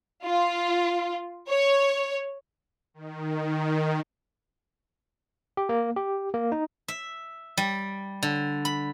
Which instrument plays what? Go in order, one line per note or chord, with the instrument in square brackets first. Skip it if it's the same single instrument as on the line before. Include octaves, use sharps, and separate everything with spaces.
[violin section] F4
C#5
[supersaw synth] D#3
[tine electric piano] G4
A#3
G4
A#3
D#4
[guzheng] E5
G3
D3
B5